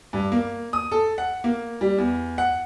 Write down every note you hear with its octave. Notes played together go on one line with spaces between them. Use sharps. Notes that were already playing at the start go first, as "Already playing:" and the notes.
G2
A#3
D#6
A4
F#5
A#3
G3
E2
F#5